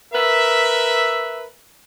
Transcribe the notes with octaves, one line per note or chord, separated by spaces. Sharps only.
A#4 B4 E5